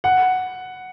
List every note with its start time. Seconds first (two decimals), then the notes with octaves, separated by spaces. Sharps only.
0.04 F#5